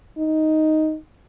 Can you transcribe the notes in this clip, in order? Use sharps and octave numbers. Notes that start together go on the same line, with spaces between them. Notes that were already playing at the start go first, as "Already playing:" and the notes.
D#4